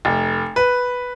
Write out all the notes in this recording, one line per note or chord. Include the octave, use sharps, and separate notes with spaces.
F1
B4